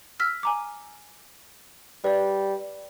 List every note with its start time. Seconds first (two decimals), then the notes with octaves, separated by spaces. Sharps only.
0.20 E6 F6 B6
0.43 G#5 A#5 D6
2.04 G3 B4 D5